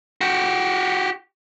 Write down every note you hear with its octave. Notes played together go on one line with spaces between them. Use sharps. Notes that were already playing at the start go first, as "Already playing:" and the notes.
F#4 G4